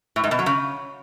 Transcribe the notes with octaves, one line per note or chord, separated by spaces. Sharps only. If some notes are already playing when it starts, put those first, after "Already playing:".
A2
G#2
B2
F#3
C#3